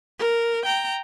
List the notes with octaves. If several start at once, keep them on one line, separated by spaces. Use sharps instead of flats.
A#4
G5 A#5